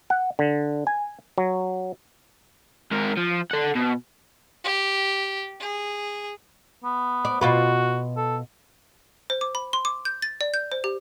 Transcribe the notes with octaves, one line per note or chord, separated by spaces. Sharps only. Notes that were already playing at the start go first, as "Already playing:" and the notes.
F#5
D3
G#5
F#3
G#2 A#4
F3
A4 F#5
B2
G4
G#4
B3
D5
B2 F4 F#4 B4
A4
C5
D6
B5
C6
D6
G6
A6
D5
G6
C5
G4